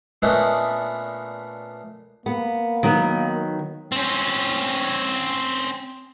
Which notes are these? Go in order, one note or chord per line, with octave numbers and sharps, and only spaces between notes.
A#2 A3 B3 C#4 D4 D#5
A#3 B3
D#3 F#3 B3
C4 C#4